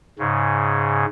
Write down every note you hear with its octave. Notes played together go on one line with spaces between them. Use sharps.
G#2 C#3